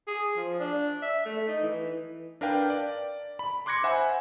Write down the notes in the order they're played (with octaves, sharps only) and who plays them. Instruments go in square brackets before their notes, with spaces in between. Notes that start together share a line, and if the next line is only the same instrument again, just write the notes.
[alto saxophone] G#4
F3
D4
E5
A3
D#4
E3
[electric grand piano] D4 A#4 B4 F5 G5
D5
B5
C6 D6 F#6 G#6 A#6 C#7
C5 E5 F#5 G#5 B5